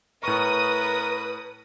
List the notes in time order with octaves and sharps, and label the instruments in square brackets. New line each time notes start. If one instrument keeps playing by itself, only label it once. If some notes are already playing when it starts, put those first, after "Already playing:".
[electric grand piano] A2 C#6 [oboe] A#4 [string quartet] B4 [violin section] D#6